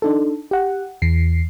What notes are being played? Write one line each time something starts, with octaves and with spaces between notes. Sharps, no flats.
D4 D#4 A4
G4 F#5
E2 C7